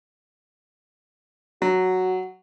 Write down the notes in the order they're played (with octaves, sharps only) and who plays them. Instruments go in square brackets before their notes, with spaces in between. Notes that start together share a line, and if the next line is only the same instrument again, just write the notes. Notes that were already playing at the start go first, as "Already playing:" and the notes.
[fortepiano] F#3 [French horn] F#4